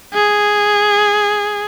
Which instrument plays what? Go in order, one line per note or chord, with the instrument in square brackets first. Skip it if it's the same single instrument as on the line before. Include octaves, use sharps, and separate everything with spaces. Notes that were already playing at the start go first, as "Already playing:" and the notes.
[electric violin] G#4